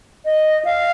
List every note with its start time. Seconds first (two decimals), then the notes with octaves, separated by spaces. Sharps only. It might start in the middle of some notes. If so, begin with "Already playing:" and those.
0.25 D#5
0.65 F5